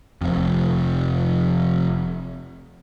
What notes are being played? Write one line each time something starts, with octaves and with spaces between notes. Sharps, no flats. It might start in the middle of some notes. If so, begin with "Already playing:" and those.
F1 F2